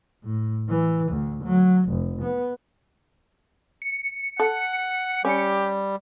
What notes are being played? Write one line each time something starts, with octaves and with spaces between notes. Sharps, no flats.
A2
E3
D2
F#3
F1
B3
C#7
A4 F#5
G3 C#4 G4